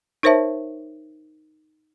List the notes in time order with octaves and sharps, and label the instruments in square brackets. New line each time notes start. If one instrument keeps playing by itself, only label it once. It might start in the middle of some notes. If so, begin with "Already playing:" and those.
[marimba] D#4 A#4 C5 C#5 E5 A5